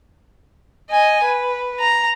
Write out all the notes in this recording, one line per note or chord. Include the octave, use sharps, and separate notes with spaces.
D#5 G#5
B4
A#5